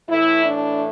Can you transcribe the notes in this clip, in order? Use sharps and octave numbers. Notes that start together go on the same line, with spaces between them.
A2 E3 A3 E4
D4